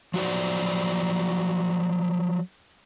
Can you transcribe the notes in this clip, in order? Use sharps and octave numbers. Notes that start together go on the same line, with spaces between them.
F3 F#3 F#4 C5 D5